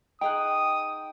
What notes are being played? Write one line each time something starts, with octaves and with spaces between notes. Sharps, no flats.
D#4 G#4 F#5 G5 D#6